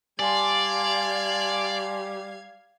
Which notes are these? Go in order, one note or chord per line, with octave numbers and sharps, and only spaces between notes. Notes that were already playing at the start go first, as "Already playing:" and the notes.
G3 D5 F5 G#5 A5 C6 G#6